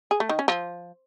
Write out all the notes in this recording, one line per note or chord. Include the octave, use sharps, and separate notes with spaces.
G#4
A3
D#3
C#4
F3